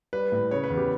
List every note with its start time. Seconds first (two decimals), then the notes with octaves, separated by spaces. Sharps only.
0.13 G3 B4
0.32 A2
0.51 C#3 C#5
0.64 B4
0.70 E2
0.77 G4